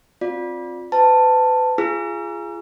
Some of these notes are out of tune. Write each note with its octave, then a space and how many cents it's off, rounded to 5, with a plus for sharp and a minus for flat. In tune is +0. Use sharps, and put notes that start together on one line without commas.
C4 +15 F4 +20 D5 +0
B4 +35 A5 +10
F4 -30 G#4 +0 E6 +45